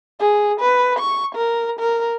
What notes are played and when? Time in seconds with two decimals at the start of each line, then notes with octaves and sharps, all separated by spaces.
0.20 G#4
0.60 B4
0.99 C#6
1.35 A#4
1.80 A#4